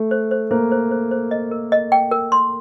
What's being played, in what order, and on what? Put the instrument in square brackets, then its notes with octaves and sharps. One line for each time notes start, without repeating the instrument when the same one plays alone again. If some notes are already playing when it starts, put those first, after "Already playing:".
Already playing: [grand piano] A3
[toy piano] C5
C5
[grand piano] A#3 [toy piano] C5
[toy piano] C5
C5
C5
D#5
A#4
D#5
G5
A#4
C6